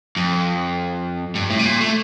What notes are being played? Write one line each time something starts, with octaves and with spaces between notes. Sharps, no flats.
F2
G2
A2
C3
A#2
A3